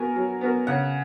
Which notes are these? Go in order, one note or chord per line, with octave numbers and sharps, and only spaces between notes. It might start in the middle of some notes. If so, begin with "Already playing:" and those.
Already playing: B3 F#4 A#4 G#5
F#3
B3 F#4 A#4
C#3 F#5